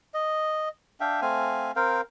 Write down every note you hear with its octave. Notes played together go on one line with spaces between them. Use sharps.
D#5
D4 E5 F5 G5
A3 C4 F5 G#5
C4 A#4 F5 G5